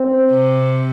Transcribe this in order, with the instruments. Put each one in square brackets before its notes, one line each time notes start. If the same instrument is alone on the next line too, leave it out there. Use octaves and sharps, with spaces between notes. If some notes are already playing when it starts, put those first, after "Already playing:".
Already playing: [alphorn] C4
[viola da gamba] C3